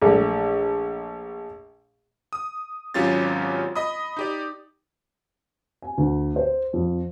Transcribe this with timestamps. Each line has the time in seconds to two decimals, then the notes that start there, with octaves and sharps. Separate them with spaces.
0.02 A#1 A3
2.33 D#6
2.94 G#1 F#3 C#4 F4 G4 A6
3.75 D#5 B5 D#6
4.17 D#4 G4 D5
5.82 G#5
5.98 D2
6.36 C5
6.73 F2